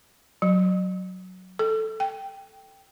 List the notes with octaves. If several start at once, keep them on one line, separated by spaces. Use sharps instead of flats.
F#3
A4
G5